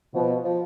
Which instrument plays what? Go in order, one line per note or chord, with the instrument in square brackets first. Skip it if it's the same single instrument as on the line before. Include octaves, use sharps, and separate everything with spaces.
[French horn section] B2 [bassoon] F3
[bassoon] F3